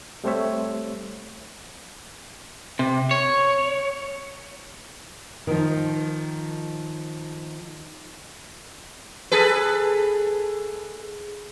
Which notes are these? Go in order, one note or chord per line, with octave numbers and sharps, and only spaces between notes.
G3 A3 C4 C5 C#5 E5
C3
C#5
D#3 F3
G#4 A4 B4